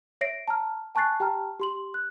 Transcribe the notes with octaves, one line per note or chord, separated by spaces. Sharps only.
C#5 E5 A#6 C7 D7
A5 A#5 F6
G#5 A5 C#6 F#6 A6 C7
G4 G5 A5 A#5 F6
G4 C6 F#7
F#6